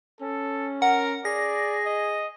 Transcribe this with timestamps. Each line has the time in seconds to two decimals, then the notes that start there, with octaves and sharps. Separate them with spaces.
0.21 C#4 A4
0.82 A#4 F#5
1.25 G#4 D5 A#6
1.86 D#5